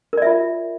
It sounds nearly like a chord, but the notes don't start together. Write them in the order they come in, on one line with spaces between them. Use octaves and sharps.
A#4 D5 E5 F4